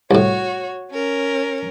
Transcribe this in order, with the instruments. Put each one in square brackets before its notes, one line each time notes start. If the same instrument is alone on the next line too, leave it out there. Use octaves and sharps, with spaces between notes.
[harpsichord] C2 A2 [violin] F#4 C#5
[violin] C#4 A#4